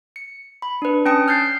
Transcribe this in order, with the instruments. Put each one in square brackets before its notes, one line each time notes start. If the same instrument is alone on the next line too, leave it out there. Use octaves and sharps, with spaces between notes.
[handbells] C#7
B5
D4 B4
C#4 G5 A5 D#6 C#7
F6 G6 A6 C7